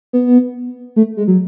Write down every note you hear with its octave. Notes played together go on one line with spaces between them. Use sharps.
B3
A3
G#3
F#3